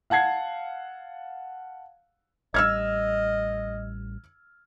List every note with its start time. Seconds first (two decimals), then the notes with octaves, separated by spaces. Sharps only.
0.10 F5 F#5 A5 G#6 C7
2.54 A1 G3 D#5 E6 F6 G#6